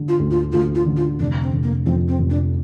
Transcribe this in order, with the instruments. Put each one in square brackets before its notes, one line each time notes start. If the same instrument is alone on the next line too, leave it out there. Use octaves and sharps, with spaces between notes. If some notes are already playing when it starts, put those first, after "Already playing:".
Already playing: [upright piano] D3
[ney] F4
[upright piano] D2
[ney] F4
[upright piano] D2 [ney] F4
[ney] F4
[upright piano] D3
[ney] F4
[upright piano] F1 [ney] D4
[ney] C4
[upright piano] F1
[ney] A#3
[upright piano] F2 [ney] C4
[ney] C4
[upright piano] F1
[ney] D4